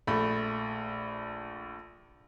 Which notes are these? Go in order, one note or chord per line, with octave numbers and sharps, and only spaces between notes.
A#1 A3 B5